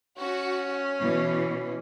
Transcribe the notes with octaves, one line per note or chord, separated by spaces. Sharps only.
C#4 F#4
B2 E3